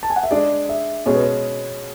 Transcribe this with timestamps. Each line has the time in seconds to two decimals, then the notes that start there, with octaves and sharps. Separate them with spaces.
0.03 A5
0.10 G#5
0.16 F#5
0.23 E5
0.31 G#3 D4 G#4 D5
0.69 E5
1.06 B2 G#3 C#4 G#4 C#5
1.16 B4
1.24 C#5